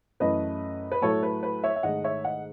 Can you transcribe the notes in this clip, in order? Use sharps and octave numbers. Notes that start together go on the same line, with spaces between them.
F#2 E3 A3 B4 D#5
B4
A2 F#3 A3 A4 C#5
B4
B4
C#5 E5
E5
G#2 D#3 A3 D#5 F#5
C#5 E5
D#5 F#5